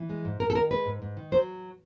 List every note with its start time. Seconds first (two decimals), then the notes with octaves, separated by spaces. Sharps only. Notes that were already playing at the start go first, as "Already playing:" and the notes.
Already playing: E3
0.09 G#3
0.25 G#2
0.40 G#2 A#4
0.50 A4
0.55 D#3 A#4
0.71 G#3 B4
0.86 G#2
1.02 G#2
1.17 D#3
1.32 F#3 C5